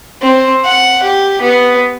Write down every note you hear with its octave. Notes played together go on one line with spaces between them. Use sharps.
C4
F#5
G4
B3